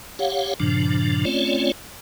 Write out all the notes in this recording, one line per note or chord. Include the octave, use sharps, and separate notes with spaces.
G4 C#5 F5 F#5
G2 A#2 C#3 F3 D4
A3 C4 C#4 F4 C#5 D5